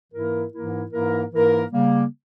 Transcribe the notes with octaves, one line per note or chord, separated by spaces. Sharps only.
G#2 E3 A#3 E4 A#4
G#2 E3 A#3 E4 A#4
G#2 E3 A#3 E4 A#4
G#2 E3 A#3 E4 A#4
C#3 G3 A#3